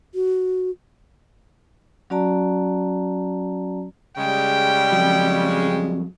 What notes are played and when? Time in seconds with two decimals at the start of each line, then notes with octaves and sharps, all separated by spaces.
0.15 F#4
2.10 F#3 C#4 F#4 D5 A5 A#5
4.18 C#3 G3 G#3 G5
4.92 F2 F#3